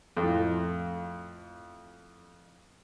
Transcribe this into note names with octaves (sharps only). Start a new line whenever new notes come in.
F2 A2